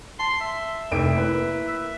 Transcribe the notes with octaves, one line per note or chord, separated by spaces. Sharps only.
A5 C6
E5
F1 C2 D7
A#3 E4 B4
E5